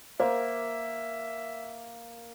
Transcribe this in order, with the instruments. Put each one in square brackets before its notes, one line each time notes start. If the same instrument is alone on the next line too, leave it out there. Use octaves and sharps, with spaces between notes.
[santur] A#3 [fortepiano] C5 [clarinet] E5